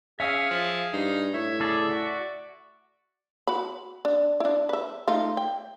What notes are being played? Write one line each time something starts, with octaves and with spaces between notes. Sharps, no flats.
C#4 G#4 E5 F5 E6
F3
G2 D#4
A2 C#5 E5
C#3 G#4 A4 D5
F#4 D5
F#4 B5
D4
D4 E4
B4 E5
A3 D#4 F4
G5